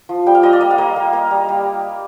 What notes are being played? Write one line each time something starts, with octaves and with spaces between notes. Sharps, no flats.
F3
G3 G5
F5
G3 D#5
D5
A#3 D#5
F5
A#3 D#5
A#3
A#3
G3
G3